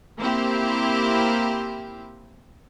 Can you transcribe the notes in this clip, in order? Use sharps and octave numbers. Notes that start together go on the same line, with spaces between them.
A#3 C4 E4 G4